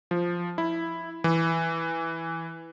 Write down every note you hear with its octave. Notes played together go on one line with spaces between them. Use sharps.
F3
E4
E3